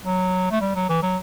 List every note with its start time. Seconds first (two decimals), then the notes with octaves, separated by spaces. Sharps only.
0.05 F#3
0.51 A3
0.61 G3
0.76 F#3
0.89 E3
1.03 F#3